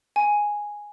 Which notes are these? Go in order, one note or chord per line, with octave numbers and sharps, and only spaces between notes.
G#5